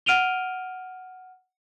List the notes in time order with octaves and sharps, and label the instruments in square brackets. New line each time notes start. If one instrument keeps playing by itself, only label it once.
[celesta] F#5 F6 D7 D#7 F7 G7